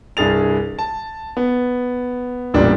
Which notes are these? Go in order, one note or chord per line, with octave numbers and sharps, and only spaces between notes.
C2 G2 G#4 A6 F7
A5
B3
E1 A1 A#2 G3 D4